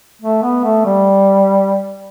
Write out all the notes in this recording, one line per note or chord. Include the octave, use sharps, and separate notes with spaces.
A3
B3
A3
G3